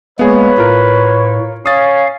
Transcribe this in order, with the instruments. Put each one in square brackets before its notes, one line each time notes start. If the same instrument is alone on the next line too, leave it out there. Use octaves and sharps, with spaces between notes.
[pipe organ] G#3 A#3 [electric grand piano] B3 G#4 [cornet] B4 [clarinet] C#5
[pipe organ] A2 [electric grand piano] F4 A#4
[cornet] C#4 [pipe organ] F5 [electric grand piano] D#6 A6